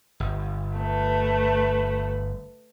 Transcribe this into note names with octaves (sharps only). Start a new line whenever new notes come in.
G1
A3 B4